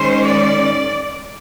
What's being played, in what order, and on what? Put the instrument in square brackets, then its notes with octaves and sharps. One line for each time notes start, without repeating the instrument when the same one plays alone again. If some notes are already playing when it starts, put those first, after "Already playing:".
Already playing: [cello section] D#3 G#3 C#4 C5
D5